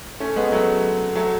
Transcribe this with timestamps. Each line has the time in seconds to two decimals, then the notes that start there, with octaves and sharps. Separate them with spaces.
0.20 A3 C#4
0.36 G#3 B3
0.52 F#3 A3
1.16 F#3 A3